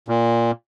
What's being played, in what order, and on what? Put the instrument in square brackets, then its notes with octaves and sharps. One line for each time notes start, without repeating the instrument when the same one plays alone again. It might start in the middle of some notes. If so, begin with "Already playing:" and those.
[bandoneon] A#2